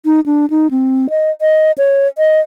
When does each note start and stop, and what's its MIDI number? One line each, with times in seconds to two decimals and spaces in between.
0.05 0.20 63
0.26 0.46 62
0.50 0.67 63
0.71 1.07 60
1.10 1.31 75
1.41 1.72 75
1.78 2.08 73
2.18 2.40 75